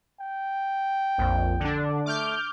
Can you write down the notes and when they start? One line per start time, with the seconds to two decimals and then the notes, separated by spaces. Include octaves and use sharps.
0.20 G5
1.18 A#1 F2
1.60 D3 D4
2.06 A3 D6 F6 G6